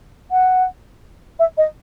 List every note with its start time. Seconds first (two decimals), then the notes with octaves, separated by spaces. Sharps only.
0.31 F#5
1.39 E5
1.57 D#5